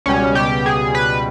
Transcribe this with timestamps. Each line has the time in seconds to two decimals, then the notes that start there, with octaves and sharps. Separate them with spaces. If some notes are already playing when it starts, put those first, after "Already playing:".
0.06 C#2 B2 G3 C#4
0.35 G4
0.66 G#4
0.95 B4